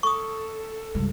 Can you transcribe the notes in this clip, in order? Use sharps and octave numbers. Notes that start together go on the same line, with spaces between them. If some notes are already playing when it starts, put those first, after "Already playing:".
A4 C#6 D#6
C#2 G2